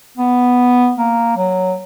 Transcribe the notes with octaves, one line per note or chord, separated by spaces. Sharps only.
B3
A#3
F#3